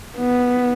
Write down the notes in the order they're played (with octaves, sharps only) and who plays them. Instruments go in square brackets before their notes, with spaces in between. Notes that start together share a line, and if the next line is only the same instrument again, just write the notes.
[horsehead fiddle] B3